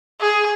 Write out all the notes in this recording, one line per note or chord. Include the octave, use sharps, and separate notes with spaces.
G#4